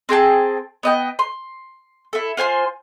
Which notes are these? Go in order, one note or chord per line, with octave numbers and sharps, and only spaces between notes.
C4 G#4 G5 A5
B3 D#5 G5
C6
E4 A4
F4 C5 G#5 C6